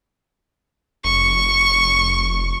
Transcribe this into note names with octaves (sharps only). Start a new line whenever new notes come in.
F1 C#6